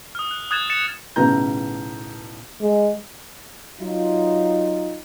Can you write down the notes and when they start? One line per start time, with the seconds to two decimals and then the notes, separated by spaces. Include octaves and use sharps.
0.15 D#6 F6
0.31 F#6
0.51 D#6 F#6 G#6 A6 E7
0.70 A6 C#7 E7
1.16 B1 A2 C#3 B4 A#5 G6
2.62 G#3
3.80 F#3 D#4 F4